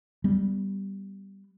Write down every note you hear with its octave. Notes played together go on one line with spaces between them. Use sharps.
G3 B3